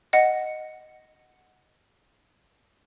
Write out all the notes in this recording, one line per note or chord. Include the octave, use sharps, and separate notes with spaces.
D#5 F#5